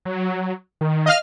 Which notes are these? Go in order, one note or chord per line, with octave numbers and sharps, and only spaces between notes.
F#3
D#3
D#5 F5 F6